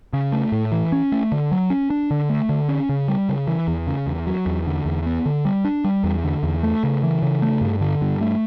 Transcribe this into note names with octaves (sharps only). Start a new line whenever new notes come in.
C#3
A3
A2
E3
C#4
A3
D3
F#3
C#4
D4
D3
A3
D3
C#4
C#3
G3
C#3
E3
E2
C#3
E2
F#3
E2
D3
E2
B3
D3
G3
D4
G3
E2
D3
E2
A3
C#3
E3
C#3
A3
G2
D3
G2
A3